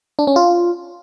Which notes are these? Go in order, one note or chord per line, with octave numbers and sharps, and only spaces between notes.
D4
C#4
F4